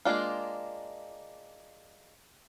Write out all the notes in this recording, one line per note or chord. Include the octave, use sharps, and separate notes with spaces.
G#3 A#3 D4 F4